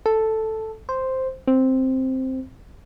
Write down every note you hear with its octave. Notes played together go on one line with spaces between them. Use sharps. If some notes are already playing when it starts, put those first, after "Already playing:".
A4
C5
C4